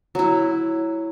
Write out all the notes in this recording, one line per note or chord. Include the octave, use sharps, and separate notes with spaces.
F#3 E4